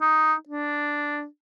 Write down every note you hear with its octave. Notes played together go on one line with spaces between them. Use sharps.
D#4
D4